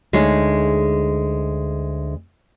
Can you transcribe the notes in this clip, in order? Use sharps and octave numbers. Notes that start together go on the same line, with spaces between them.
D2 G#3 D#4 G#4 C#5